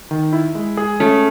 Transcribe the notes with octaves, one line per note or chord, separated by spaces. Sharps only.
D#3
E4
G#3
G#4
A3 C#4